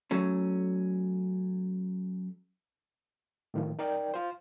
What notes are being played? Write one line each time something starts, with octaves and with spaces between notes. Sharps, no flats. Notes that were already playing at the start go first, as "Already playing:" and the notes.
F#3 A3 C#4
A2 D#3 F3
D#4 A#4 D5 G5
F4 C5